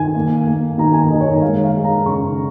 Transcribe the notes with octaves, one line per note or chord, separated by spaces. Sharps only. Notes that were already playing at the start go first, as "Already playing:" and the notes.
Already playing: D#3 G#5
A#3
A#3
D#3 A#5
G#5
D#3 D#5
C#5
A#4
G#3 F5
F5
G#3
A#5
C#3 C#6